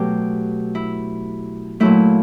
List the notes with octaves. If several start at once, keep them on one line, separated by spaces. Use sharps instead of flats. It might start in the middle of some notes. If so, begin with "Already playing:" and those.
Already playing: B2 F#3 A3 G4
E4
A#2 F#3 A3 E4